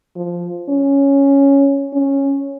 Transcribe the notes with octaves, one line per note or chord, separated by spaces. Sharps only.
F3
C#4
C#4